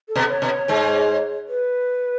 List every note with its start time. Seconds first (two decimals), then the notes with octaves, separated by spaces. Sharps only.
0.09 A4
0.15 B2 B3
0.29 C#5
0.42 B2 B3
0.49 C#5
0.68 G#2 G#3
1.49 B4